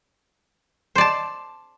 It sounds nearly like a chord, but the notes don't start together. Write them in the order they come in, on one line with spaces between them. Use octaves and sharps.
C5 D5 A5